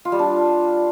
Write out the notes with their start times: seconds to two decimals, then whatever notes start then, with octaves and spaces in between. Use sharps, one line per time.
0.05 F4
0.12 G3
0.19 D4